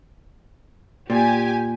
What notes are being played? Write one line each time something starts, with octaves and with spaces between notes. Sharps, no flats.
A#2 G4 G#5